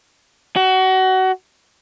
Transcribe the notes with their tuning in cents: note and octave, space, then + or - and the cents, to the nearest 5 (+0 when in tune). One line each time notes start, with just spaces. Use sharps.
F#4 +25